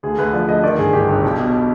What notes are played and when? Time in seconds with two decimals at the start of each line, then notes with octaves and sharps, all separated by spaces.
0.03 D2 G#4
0.18 D2 B4
0.33 F3 D5
0.48 D2 D#5
0.63 D#3 D5
0.78 G1 G#4
0.93 G1 G4
1.09 G1
1.24 B1
1.39 B2